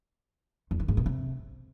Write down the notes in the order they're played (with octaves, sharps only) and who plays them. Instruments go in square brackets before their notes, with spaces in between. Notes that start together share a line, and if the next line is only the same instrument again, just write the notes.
[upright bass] E2
D#3
G#2
B2
C3